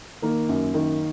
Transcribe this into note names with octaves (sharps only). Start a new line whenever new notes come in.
D#3 A#3 A#4
F#2
D#3